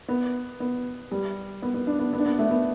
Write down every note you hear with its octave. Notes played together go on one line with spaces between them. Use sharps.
B3
B3
G3
B3
B3
D4
B3
B3
D4
B3
A3
B3